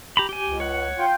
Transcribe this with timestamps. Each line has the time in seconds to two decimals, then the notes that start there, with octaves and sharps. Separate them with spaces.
0.17 G4 A#5 B5
0.29 G4 G#5
0.47 C#2
0.60 C#5 F#5
0.98 F4 G5